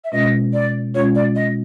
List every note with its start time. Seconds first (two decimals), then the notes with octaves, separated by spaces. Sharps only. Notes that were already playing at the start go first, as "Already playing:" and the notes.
0.04 E5
0.12 B2 G#3 C#4 F4 D#5
0.53 D5
0.94 B2 G#3 C#4 F4 C#5
1.15 D5
1.36 D#5